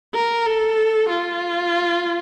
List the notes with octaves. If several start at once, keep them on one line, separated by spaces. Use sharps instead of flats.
A#4
A4
F4